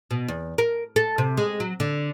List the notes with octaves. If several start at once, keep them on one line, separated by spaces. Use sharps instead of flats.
B2
E2
A#4
A4
C3
G#3
F#3
D3